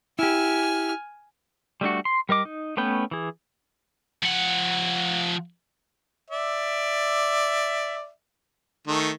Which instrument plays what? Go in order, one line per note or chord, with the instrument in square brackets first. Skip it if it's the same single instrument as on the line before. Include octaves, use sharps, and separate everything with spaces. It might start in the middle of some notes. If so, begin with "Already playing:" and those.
[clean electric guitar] E4 G4 [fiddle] G#5 F6
[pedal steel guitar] G3 A3 D4 F#4
C6
G3 A#4 D#5 D6
D#4
A3 B3 C#4 B4 G5
E3 G#4
[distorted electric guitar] F3 F#5
[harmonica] D5 E5
D#3 A3